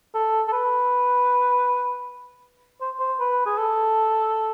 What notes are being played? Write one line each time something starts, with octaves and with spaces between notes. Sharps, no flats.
A4
A4
B4
C5
C5
B4
G#4
A4